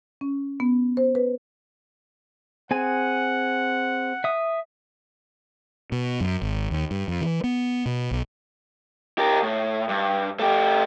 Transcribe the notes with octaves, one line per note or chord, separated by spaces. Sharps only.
C#4
B3
C5
B4
C4 G#4 F#5 G#5
E5 D#6
B2
F#2
G#1
D#2
G2
F2
E3
B3
B2
B1
G4 A#4
A2
G2
A3 G4